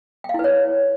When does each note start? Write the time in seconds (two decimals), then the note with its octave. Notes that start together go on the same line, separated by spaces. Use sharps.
0.24 G5
0.29 F5
0.34 E4
0.39 B4
0.44 C#5